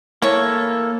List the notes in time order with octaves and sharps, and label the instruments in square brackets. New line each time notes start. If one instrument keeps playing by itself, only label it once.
[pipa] E3 C#5 [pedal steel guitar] A#3 A4